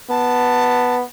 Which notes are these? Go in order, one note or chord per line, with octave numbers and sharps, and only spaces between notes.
B3 A5